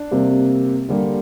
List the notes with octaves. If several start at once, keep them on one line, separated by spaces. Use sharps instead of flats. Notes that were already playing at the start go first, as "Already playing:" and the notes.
Already playing: D4
C3 G3 A#3
D3 G3 A#3